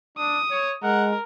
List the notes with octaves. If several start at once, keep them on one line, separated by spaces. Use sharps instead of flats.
D4 D#6
C#5
G#3 A#4 F#5